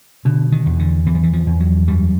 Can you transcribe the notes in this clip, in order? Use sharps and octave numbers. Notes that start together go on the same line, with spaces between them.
B2 D3
D#3
E2
D3
E2 E3
F3
E3
F3
E2
F#3
F#2 G3